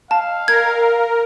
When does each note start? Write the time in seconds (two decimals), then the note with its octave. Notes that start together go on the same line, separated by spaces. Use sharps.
0.11 F5 A5
0.48 A#4 G#6